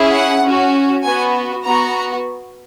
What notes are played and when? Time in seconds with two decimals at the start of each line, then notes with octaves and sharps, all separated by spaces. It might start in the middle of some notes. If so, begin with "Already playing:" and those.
Already playing: C#4 E4 G#4
0.12 F#5
0.43 C#4 F#4
1.03 B3 F#4 G#5
1.65 B3 F#4 A#5